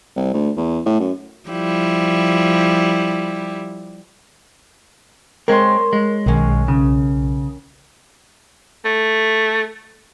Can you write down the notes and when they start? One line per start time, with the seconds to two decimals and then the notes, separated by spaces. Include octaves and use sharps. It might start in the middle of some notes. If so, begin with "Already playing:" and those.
0.16 C2
0.34 D2
0.57 E2
0.86 A2
1.00 F#2
1.49 F3 G3 E4
5.48 G#3 C4 A#4 C#5 C6
5.93 G#3
6.26 B1 D#3 C#4
6.68 C#3
8.85 A3